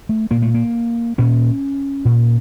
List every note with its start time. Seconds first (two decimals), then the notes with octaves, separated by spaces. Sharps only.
0.09 A3
0.31 A#2 A#3
0.42 A3
0.54 A#3
1.18 A#2 C#4
2.05 A#2